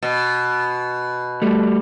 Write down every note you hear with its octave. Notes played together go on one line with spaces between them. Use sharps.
B2
G3 A3